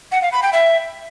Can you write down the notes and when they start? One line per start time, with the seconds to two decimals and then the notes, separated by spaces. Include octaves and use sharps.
0.12 F#5
0.22 F5
0.32 B5
0.43 G5
0.53 E5